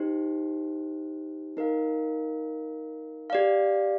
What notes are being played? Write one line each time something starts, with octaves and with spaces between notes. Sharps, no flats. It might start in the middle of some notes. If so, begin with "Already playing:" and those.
Already playing: D#4 G4 C5
D#4 A#4 F5
G4 D5 F5